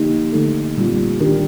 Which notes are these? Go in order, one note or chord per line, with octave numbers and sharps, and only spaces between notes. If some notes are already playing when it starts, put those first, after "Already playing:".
Already playing: D3 F3 A#3 D#4 G4
D3 A3 D#4 A4
A#2 G3 C4 F4
D#3 G3 D4 G4 A#4